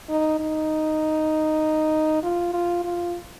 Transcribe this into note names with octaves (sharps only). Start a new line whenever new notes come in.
D#4
D#4
F4
F4
F4